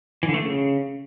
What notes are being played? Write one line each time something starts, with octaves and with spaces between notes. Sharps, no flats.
E3
D3
A3
C#3